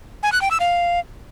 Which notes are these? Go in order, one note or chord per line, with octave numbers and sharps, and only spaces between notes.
G#5
F#6
G5
E6
F5